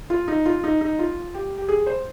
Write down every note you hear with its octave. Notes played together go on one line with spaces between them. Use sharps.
F4
D#4
F4
D#4
D#4
F4
G4
G4
G#4
C5